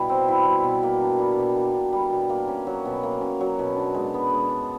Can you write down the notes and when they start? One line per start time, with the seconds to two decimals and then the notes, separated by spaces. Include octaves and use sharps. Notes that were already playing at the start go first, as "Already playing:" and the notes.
Already playing: B2 G3 E4
0.09 C4
0.28 E4
0.46 G3
0.64 B2
0.83 A#3
1.01 D4
1.19 G3
1.38 B2
1.57 A#3
1.74 D4
1.93 G3
2.11 B2
2.29 A#3
2.48 C#4
2.67 F#3
2.85 B2
3.03 A#3
3.21 C#4
3.41 F#3
3.59 B2
3.76 D4
3.95 G#3
4.14 B3
4.32 G#3
4.50 D4